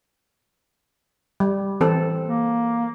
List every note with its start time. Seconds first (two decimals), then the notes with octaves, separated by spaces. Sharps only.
1.40 G3
1.81 E3 C4 A4
2.26 A#3